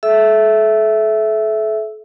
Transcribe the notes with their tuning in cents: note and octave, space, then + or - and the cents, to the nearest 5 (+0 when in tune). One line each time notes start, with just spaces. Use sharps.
A4 -35 E5 +0 E6 +0